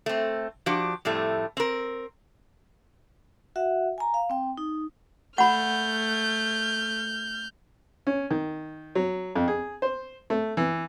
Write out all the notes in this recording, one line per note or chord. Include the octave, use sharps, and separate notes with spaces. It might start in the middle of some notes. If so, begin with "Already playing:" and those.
A3 C4
F3 D4 F#4 G4
F2 A2 G3 A3
C4 A#4
F#4 E5 F#5
G#5 A#5
F5
C4 G5
D#4
A3 F#5 B5 F6 G6
C#4
D#3
F#3
F2
G#4
C5
A3
E3